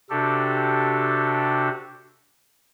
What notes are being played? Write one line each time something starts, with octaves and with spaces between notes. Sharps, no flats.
C3 D4 F#4 G4 A4